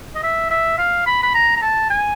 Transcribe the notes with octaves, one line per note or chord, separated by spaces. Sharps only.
D#5
E5
E5
F5
B5
B5
A#5
A#5
A5
G#5